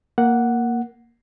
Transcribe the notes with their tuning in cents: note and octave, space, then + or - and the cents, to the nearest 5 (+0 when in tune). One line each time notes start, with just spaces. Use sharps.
A#3 +0 F#5 +0